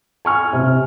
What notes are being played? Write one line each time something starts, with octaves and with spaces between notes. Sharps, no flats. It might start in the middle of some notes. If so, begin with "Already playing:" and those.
G#5 C#6 F6
C3